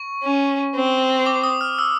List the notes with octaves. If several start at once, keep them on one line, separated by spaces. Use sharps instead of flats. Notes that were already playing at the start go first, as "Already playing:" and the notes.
Already playing: C#6
C#4
C4
D6
D#6
F6
E6